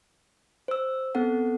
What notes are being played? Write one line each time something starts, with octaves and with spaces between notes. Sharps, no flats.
C5 E6
B3 C4 A4 F#5